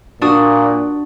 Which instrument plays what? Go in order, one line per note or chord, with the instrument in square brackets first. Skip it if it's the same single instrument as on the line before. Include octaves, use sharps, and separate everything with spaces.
[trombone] A#2 [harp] D4 F#4 D#6